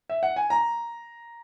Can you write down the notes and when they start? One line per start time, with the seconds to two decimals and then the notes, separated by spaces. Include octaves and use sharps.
0.10 E5
0.23 F#5
0.36 G#5
0.50 A#5